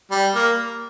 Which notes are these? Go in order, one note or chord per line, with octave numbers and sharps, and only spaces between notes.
G3
A#3